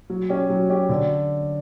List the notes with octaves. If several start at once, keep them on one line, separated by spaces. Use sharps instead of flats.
F#3
C#4 G4
F#3
C#4 G4
D3